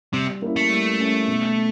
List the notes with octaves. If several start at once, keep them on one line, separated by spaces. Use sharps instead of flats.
C3 G3
A#3 C#4 E4
A3
G3
A#3 C#4 E4
B2